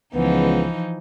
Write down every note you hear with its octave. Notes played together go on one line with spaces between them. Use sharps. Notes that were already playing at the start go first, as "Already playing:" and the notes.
C#2 E3 F3 B3 D#4